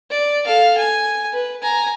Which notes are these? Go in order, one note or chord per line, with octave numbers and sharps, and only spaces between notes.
D5
A4 F5
G#5
B4
G#5 A#5